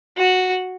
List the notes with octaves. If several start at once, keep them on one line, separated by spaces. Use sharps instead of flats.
F#4